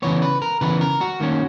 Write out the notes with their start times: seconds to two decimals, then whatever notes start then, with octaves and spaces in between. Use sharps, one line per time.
0.02 C#3 E3 B3 C#5
0.22 B4
0.42 A#4
0.61 C#3 E3 B3 B4
0.81 A#4
1.01 F#4
1.20 D#3 A#3 C#4